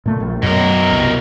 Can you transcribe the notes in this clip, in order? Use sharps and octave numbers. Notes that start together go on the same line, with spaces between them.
A#2 A3
A#1
F#2 B2 A#4
C2